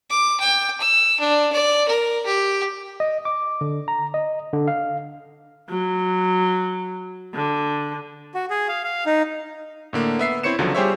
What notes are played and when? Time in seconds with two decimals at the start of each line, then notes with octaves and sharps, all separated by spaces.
0.10 D6
0.40 G5
0.81 E6
1.20 D4
1.52 D5
1.88 A#4
2.26 G4
3.00 D#5
3.25 D6
3.61 D3
3.88 A#5
4.14 D#5
4.53 D3
4.68 F5
5.69 F#3
7.35 D3
8.34 F#4
8.50 G#4
8.69 F5
8.84 F5
9.06 D#4
9.93 A2 D3 A#3
10.19 B3 E5 C7
10.43 C4 E4 C5 C#5 C#7 E7
10.59 C#2 D3 F3 F#3
10.74 G3 G4 G#4 C5 C#5 E5